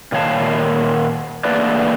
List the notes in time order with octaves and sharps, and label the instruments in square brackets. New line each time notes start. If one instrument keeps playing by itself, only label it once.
[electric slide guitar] A#2 D#3 C#5 F5 A5
E2 A3 A#3 D4 B4 D5